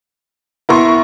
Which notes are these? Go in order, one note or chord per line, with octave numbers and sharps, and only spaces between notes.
B3 E4 A#4 C6 C#6